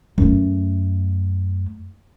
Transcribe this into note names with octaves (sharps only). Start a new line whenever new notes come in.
F#2 A3